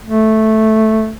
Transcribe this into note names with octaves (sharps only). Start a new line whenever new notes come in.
A3